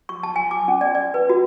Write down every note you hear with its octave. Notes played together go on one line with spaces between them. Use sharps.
C#6
A5
G#5
D6
C#4
D5
D5
B4
F#4